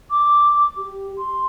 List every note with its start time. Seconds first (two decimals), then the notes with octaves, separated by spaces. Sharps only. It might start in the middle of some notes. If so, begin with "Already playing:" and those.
0.10 D6
0.77 G4
1.18 C6